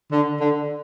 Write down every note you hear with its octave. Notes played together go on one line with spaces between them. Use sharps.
D3
D3